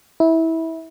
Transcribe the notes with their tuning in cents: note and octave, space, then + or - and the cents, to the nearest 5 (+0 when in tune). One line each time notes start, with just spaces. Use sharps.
E4 -20